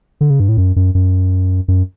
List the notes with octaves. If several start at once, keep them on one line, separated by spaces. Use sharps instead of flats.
D3
C#3
G2
A2
F#2
F#2
F#2
F#2